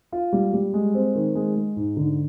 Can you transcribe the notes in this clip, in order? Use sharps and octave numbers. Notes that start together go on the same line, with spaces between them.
F4
G3
G3
G#3
C4
D#3
G#3
G#3
G#2
D3